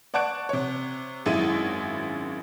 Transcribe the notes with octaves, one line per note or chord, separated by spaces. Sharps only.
D5 F#5 A5 C#6 F#6 D7
C3 C#5
G#1 F#2 G#3 E4 D#7